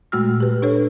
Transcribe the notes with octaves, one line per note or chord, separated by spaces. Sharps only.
A#2 G#3 A3 F#4 E6 F6
G4 B4
D4 A4 B4 C#5